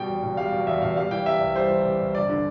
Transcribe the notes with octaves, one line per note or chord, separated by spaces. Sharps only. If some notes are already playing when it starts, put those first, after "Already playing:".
Already playing: B2 G3 G5
E2
E1
G3 F5
B2
E2 E5
E1 F5
G3 F5
E3 G5
C3 E5
C2
G3 C5
E3
C3
C2
G1 D5
D3